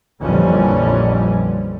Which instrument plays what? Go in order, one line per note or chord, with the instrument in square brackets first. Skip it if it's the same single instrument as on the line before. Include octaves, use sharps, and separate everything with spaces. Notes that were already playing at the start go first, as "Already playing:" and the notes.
[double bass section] A#1 F2 D3 E3 G3 C#4